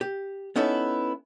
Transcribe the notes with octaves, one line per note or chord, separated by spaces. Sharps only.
G4
B3 C#4 D#4 E4 A4